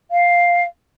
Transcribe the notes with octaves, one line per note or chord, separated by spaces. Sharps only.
F5